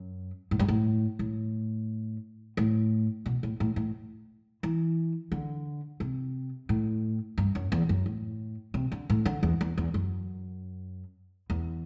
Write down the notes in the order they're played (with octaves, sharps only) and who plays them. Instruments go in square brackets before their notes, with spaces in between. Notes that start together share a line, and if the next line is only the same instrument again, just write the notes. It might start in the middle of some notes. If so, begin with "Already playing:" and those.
Already playing: [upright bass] F#2
A2
G2
A2
A2
A2
B2
A2
A2
A2
E3
D3
C3
A2
G2
F#2
E2
F#2
A2
C3
D3
A2
D3
E2
E2
E2
F#2
E2